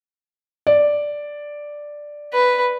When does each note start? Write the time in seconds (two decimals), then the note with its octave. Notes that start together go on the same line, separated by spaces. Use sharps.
0.67 D5
2.34 B4